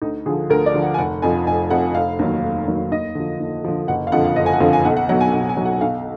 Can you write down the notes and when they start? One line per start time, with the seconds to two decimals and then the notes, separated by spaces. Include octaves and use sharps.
0.02 D2 D#4
0.26 D3 F3 G#4
0.50 D2 A#4
0.66 D5
0.74 D3 F3
0.82 F#5
0.94 G#5
0.98 F1 F#5
1.22 F2 F3 G#5
1.47 F1 G#5
1.70 F2 F3 F#5
1.95 F1 F5
2.19 D#2 D#3 F#3
2.43 F1
2.67 D#2 D#3 F#3
2.91 D#2 D#5
3.15 D3 F3
3.40 D#2
3.64 D3 F3
3.88 F#1 F#5
4.07 F5
4.12 F2 D3 F3 F#5
4.24 F5
4.36 F#1 D#5
4.46 G#5
4.53 F#5
4.60 F2 D3 F3 F5
4.73 G#5
4.84 B1 F#5
4.97 F#5
5.09 B2 F#3 F#5
5.21 G#5
5.33 B1 F#5
5.49 G#5
5.57 B2 F#3
5.65 F#5
5.81 B1 F5